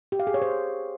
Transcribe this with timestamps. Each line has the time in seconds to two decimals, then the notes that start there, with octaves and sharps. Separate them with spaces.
0.12 G4
0.20 F5
0.27 G#4
0.34 C#5
0.42 C5